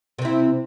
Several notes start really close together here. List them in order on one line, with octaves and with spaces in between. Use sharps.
C3 C4 E4